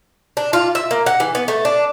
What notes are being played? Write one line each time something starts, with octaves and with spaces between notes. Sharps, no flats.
D4
F4
E5
A#3
F#5
E3
B3
A3
D4